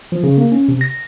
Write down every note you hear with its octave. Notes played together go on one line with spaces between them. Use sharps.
F3
C#3
A#3
C#4
C3
A#6